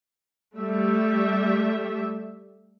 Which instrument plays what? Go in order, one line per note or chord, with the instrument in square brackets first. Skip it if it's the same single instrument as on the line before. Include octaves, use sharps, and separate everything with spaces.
[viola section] G3 A3 E5